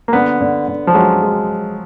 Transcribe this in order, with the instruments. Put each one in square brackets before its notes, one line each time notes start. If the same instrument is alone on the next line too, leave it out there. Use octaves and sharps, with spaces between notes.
[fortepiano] A#3
[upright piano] D3 [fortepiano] B3
[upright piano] D3
D3
[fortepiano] F3
[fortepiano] F#3 [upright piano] G#3
[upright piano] G#3